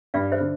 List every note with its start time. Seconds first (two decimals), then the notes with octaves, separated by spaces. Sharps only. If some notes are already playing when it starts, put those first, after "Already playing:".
0.14 G2 D5 F5
0.32 C5 E5
0.40 D3